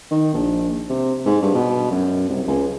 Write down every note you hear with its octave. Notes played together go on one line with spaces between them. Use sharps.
D#3
A#1
C3
G#2
G2
B2
F#2
C2
C#2